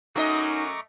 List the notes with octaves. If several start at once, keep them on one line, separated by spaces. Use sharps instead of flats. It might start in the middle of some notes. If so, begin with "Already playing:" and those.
F#2 A3 D#4 D#5 A#5 C#6 D6